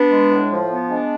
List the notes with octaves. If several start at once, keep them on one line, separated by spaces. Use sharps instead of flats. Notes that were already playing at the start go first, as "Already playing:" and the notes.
Already playing: B3 D4
G#3
A2
F3
B3
G#3 D4